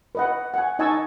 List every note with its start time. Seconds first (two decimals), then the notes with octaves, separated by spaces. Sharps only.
0.15 B4 D#5 F#5
0.54 F#5 G#5
0.79 D#4 D#5 G#5 A5 C#6 E6